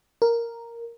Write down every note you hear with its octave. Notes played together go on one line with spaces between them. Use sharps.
A#4